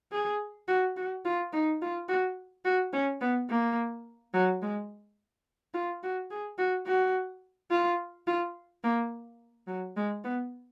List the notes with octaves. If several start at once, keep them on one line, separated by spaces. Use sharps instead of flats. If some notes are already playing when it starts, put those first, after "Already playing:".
G#4
F#4
F#4
F4
D#4
F4
F#4
F#4
C#4
B3
A#3
F#3
G#3
F4
F#4
G#4
F#4
F#4
F4
F4
A#3
F#3
G#3
B3